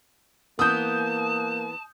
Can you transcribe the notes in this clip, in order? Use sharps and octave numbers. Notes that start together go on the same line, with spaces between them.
E3 A#3 B3 A5 D#6 G6